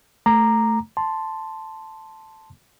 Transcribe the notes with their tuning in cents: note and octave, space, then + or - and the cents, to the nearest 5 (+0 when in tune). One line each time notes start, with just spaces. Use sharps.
A3 +0 A#5 +0 D6 +20
A5 +0 C6 +0